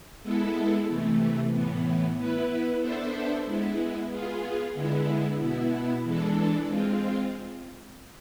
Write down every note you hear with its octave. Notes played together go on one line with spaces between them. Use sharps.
G#3 B3 E4 A4
C3 E3 A3
A2 E3 B3
B3 E4 B4
B3 D4 A4 C5 E5
G#3 B3 E4
B3 F4 G#4
D3 G#3 B3 E4
B2 B3 E4
E3 G#3 D4 A4
G#3 C4 F4